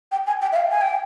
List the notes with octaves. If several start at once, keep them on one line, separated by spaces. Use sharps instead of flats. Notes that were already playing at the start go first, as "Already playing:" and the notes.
G5
G#5
G5
E5
F5
G#5
G5